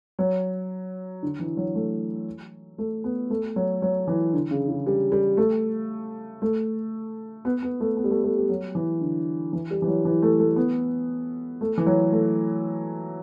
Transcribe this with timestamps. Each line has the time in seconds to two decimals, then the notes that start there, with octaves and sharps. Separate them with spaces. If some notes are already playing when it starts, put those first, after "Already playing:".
0.19 F#3
1.23 D3
1.40 E3
1.57 F#3
1.75 A3
2.78 A3
3.04 B3
3.30 A3
3.56 F#3
3.82 F#3
4.08 E3
4.33 D3
4.51 C#3
4.68 C#3
4.86 G3
5.12 G3
5.37 A3
6.42 A3
7.45 B3
7.63 B3
7.80 A3
7.97 B3
8.04 G3
8.11 A3
8.23 A3
8.37 G3
8.49 F#3
8.75 E3
9.01 D3
9.53 E3
9.71 G3
9.82 E3
9.87 F#3
10.05 E3
10.22 A3
10.40 A3
10.56 B3
11.61 A3
11.78 E3
11.86 F#3
12.12 A3